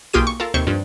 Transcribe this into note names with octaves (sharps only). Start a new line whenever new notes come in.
B1 A#3 F4 G4 G#4 D#7
C#6
F4 A4 A#4
D#2 C3 C5 C#6
G2 F3